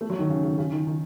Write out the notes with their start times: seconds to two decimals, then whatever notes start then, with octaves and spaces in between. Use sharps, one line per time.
0.01 A3
0.10 F#3
0.19 D#3
0.29 C#3
0.44 C#3
0.58 C#3
0.72 D#3
0.87 D#3